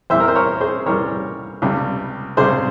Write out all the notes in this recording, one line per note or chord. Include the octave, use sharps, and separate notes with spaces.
E2 E3 G3 C5 E5
A#4
C5
A#4 C#5
G#4 C5
E2 E3 G3 A#4 C#5
C#2 C3 G3
C#2 C3 G3 G#4 C5